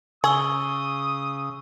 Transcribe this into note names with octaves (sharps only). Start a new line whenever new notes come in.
C#3 G#4 C#6 D#6 E6 G7